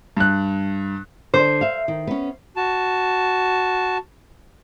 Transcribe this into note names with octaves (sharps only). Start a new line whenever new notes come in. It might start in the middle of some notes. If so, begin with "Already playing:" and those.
G2 F#6
D3 C5
E5 F5
D#3
B3 C#4
F#4 A5